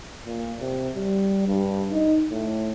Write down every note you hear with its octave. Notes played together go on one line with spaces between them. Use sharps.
A#2
C3
G3
G2
D#4
A2